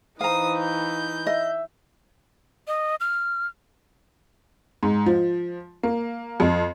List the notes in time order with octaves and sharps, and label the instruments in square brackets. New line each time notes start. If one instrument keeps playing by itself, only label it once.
[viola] E3 D#4 [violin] C5 D#6 [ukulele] F5 A#5
[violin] G6
[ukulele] D#5 [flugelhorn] E5
[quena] D#5
F6
[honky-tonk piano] G#2
F3
A#3
F2